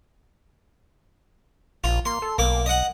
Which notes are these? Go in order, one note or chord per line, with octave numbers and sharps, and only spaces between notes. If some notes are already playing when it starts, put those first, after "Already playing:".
A#1 F4
A#3 C6
A4
B1 A#3 D6
D#5 F#5